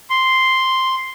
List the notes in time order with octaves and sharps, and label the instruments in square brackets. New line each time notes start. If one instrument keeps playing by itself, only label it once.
[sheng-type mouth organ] C6